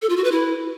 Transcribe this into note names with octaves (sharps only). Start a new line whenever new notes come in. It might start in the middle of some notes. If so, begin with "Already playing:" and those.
A4
F4
F#4
B4
E4